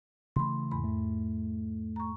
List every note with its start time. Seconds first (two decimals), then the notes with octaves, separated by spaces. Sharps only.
0.36 C#3 E3 A3 B5 C6
0.71 E2 G#2 B5
0.84 A3
1.96 A#5 C#6